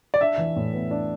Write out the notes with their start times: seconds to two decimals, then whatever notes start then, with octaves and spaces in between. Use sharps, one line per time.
0.14 D5
0.21 D4 E5
0.38 E3
0.56 A2
0.73 B3
0.91 D4